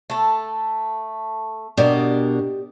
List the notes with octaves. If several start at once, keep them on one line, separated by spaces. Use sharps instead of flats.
A3 A4
B2 D4 G4 A#4 D5 D#5